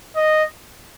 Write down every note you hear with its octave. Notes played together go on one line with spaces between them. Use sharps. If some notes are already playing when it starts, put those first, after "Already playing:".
D#5